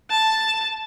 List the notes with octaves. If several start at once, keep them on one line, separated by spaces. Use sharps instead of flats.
A5